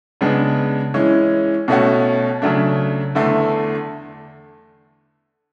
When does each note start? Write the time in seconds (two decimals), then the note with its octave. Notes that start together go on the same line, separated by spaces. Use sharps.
0.21 C#3 G#3 B3 D4
0.94 E3 G#3 C#4
1.68 B2 A3 C#4 F#4
2.42 C#3 F#3 A3 D4
3.15 E2 D3 A3